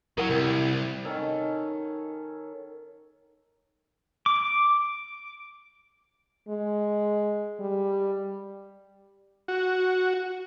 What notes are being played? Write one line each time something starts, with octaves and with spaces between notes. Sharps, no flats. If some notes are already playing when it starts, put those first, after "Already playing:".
D#3 F#3 E4 A#4 F#5
C2 C3
D#3 C#4 A4
D6
G#3
G3
F#4